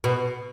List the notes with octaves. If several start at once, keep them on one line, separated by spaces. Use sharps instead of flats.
B2